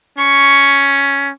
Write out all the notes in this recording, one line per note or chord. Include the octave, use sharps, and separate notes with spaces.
C#4 C#6